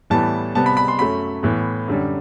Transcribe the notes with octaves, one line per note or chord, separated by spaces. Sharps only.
A2 E3 G3 B3 A5
C3 G3 B3 A5
B5
B5
C6
F#2 F#3 A3 B5
A2 E3 B3
F#2 D3 G3